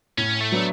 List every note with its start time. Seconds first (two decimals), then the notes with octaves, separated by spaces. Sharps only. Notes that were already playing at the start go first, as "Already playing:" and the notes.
0.18 A2 C#4
0.41 A3
0.52 F#3 B3 D4